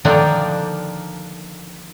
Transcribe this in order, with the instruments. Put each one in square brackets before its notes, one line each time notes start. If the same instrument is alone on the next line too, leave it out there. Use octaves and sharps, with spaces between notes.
[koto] D3 D#3 F3 A#3 D4 D#4